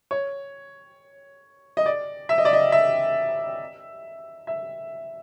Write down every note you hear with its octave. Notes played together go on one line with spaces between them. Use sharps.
C#5
D#5
D5
E5
D#5
D5
D#5
E5
E5